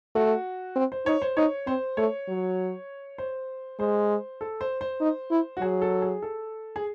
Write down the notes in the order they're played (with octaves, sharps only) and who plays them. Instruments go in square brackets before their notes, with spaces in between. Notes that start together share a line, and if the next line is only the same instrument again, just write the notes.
[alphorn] A3 [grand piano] F#4
[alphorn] C4
[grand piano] C5
[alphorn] D#4 [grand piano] C#5
[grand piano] C5
[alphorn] D#4 [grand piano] C#5
[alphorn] C4 [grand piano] C5
[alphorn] A3 [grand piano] C#5
[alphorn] F#3
[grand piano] C5
[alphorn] G#3 [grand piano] C5
[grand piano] A4
C5
C5
[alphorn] D#4
E4
[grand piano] F#4
[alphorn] F#3 [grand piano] G#4
[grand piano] A4
G#4
A4
G#4